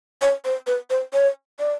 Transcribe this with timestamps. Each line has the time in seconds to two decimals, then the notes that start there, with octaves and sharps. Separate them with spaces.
0.22 C#5
0.45 C5
0.67 B4
0.90 C5
1.14 C#5
1.59 D5